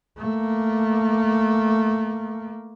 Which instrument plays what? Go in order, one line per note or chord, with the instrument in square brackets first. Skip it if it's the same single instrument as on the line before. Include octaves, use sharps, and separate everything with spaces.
[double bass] A3 A#3